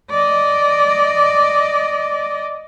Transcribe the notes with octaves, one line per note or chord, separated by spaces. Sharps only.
D5 D#5